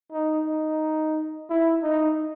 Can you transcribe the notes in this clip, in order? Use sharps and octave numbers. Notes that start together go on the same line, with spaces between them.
D#4
D#4
E4
D#4